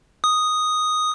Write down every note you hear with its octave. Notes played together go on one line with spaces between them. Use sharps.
D#6